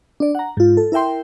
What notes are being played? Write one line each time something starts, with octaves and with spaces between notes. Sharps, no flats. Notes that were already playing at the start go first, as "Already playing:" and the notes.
D4 D5
F#5 A#5
G#2 F4
A4
E4 A#4 E5 G5 C6